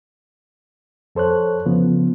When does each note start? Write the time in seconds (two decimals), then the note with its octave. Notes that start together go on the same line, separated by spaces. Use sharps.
1.15 F2 A4 C5 C#5 F#6
1.66 C#3 F3 B3